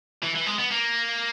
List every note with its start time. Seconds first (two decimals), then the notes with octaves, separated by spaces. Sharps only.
0.23 E3
0.35 E3
0.47 G#3
0.59 B3
0.72 A#3